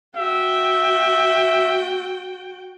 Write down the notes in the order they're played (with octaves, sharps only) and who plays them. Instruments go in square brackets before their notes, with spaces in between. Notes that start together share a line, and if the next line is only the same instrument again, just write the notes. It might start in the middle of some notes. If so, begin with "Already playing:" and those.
[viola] F#4 G5 [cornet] E5